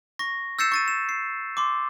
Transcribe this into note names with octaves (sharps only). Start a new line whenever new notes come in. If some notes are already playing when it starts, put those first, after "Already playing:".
C#6 A#6
E6 G6 A6 C7 C#7 E7
C#6 A6 D#7
E7
C7
C6 D6